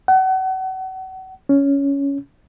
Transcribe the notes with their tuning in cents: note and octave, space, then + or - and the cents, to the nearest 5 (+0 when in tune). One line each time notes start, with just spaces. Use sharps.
F#5 +35
C#4 +10